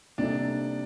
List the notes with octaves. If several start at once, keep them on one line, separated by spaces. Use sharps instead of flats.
C3 G3 A#3 D4 D#4 A4